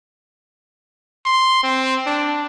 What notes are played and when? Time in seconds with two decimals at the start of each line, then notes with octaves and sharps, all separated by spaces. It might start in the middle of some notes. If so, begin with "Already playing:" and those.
1.26 C6
1.63 C4
2.07 D4